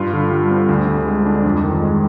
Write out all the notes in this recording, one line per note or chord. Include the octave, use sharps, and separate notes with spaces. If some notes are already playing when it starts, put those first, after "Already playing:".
Already playing: G2 F4
D3
G3
C4
D2
D3
G#3
D4
F2
D#3
G#3